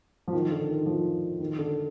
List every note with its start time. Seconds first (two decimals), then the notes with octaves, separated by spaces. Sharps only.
0.28 F3
0.33 D#3
0.51 D3
0.69 D#3
0.86 F3
1.40 D#3
1.58 D3